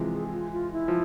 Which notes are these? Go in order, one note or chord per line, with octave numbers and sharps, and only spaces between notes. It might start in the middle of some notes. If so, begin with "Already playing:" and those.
Already playing: C3 E3 F3 G#3
G#4
E4
F4
F4
E4
F3